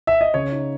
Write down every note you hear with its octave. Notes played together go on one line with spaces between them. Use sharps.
E5
D#5
C#3 C#5
D#4